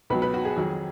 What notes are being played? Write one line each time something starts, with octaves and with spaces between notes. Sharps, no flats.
C#2 B2 F#3 B4
B4
F#4
G#4
F2 D#3 F#3